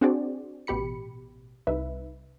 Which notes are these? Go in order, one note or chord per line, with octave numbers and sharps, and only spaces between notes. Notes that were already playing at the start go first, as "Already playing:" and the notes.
C4 D4 F#4 G#4 C5 D5
A1 B2 G4 B5 C#7
C2 D#4 B4 E5